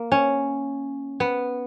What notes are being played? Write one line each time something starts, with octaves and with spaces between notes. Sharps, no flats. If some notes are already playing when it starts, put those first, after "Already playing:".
Already playing: A#3
C#4
B3